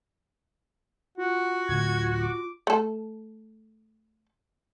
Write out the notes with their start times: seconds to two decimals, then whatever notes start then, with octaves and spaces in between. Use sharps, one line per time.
1.17 F4 F#4 F#5
1.69 D1 D2 G#6
2.20 D6
2.67 A3 A4